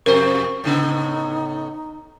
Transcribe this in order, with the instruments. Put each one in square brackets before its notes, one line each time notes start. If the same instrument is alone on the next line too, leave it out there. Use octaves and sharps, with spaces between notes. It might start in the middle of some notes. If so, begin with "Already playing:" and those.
[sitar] F2 C3 C5 [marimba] A#4 [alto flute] C#6
[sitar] A2 C#3 B3 [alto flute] D#4